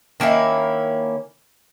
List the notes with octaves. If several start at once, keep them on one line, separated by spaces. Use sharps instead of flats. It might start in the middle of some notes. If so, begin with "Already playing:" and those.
D#3 A#3 C#4 E4